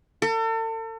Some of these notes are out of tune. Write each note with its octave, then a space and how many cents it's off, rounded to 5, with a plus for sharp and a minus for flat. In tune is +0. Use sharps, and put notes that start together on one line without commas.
A4 +40